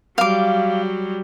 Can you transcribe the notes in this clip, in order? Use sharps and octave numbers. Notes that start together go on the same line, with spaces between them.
F#3 G3 F5 D6